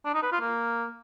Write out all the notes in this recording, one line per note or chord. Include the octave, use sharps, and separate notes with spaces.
D4
D#4
B4
F4
A#3